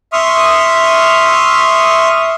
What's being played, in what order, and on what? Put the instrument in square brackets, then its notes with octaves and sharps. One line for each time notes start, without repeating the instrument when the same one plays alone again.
[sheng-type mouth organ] E5 C6 C#6 D#6 F6